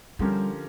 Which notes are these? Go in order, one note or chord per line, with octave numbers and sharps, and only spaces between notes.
D3 F3 G3 C#4 G4 A#4